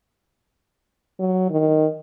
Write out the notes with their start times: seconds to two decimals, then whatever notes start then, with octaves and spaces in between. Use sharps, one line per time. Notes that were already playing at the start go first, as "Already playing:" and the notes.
1.20 F#3
1.50 D#3